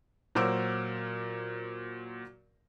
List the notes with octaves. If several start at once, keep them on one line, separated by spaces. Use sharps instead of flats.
A#2 F#3 A#4 C5 D6 E6